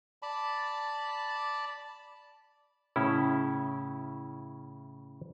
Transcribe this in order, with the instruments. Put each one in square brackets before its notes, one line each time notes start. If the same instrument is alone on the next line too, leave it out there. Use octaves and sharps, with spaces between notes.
[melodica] D5 A5 B5
[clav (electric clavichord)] A2 C#3 C#4 E4